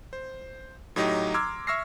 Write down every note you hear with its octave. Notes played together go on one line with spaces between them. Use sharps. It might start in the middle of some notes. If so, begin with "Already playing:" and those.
C5
A2 F#3 D#4 G4 D#5
A#5 C6 D6 E6 F6 G#6
E5 C#6 E6 F6 A#6 C7